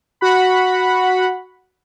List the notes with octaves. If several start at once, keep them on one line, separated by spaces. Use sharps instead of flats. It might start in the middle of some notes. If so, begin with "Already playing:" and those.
F#4 F#5 B5